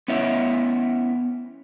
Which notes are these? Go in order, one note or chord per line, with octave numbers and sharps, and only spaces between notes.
B3 C#4 E4 C#5 E5